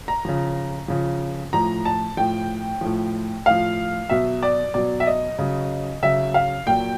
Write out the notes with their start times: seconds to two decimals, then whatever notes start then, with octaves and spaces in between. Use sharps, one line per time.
0.08 A#5
0.25 C#3 F3
0.88 C#3 F3
1.53 A2 F3 A#5
1.85 A5
2.17 A2 F3 G5
2.81 A2 F3
3.46 A2 F3 F5
4.10 B2 F#3 E5
4.43 D5
4.74 B2 F#3 D5
5.00 E5
5.07 D#5
5.38 C#3 F#3
6.03 C#3 F#3 E5
6.34 F5
6.67 A#2 F#3 G5